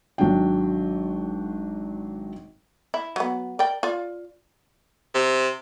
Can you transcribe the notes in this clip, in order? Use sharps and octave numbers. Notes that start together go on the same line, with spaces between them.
G#1 F#3 D4 G5
E4
F#3 B3
A#4 D5 G5
F4 D5
C3